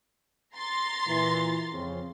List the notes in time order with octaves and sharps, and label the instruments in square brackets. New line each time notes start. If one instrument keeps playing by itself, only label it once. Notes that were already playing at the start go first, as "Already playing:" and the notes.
[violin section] A#5 C6 A6
[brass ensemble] A#2 E3
F2 C#3 C4